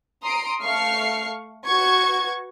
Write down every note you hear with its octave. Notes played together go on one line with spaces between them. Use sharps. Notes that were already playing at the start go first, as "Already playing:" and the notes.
A#5 C6 D#6 C7 D7
A3 F5 C#6 F6 C7
F#4 B4 C#6 G#6